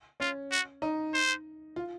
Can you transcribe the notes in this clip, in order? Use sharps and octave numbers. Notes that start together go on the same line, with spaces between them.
C#4 F4
F#4
D#4
C5
F4